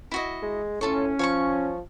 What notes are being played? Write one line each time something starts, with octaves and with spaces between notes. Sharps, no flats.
E4 F#4 D#5
G#3
A2 C#4 F4 A4 C#6
F3 C#5 F5 C#6